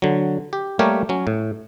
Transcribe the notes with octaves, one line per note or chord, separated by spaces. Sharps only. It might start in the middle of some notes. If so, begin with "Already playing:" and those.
D3 F#3
G4
G3 A3 A#3 G4 A#4 C#5
F#3 C#4
A2